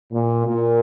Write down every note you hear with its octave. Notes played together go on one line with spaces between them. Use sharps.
A#2
A#2